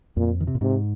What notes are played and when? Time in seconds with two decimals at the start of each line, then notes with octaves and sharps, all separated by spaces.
0.16 F2 A#2
0.41 D#3
0.47 C3
0.55 A#2
0.61 G#2 C3